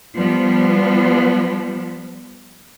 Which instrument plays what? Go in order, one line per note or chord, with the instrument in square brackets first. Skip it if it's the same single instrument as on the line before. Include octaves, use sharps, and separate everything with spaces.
[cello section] F3 G3 B3